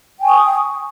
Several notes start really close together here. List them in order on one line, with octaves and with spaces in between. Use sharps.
G5 G#5 C#6 D#6